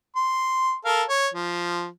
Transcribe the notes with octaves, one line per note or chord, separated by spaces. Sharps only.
C6
A4 A#4 F5
C#5
F3